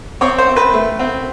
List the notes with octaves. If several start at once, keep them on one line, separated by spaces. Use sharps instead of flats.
C4 C#5
C5
C4
B4
A3
C4